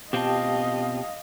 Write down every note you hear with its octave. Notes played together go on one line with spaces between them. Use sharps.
B2 C4 F4 G4 D#5 F5 G5 A5